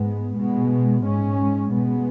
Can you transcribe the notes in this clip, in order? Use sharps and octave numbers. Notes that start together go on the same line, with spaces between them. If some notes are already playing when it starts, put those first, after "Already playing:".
Already playing: G#2 G#3 B3
B2 G#3 B3
G#2 G#3 C#4
B2 G#3 B3